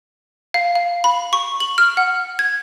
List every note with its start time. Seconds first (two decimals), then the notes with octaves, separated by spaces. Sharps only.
0.54 F5
0.75 F5
1.04 B5
1.33 C#6
1.60 F#7
1.78 F6
1.97 F#5
2.39 G#6